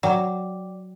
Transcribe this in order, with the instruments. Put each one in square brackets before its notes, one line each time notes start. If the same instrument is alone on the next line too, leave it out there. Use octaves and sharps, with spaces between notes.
[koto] F#3 [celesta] D5 G5 D6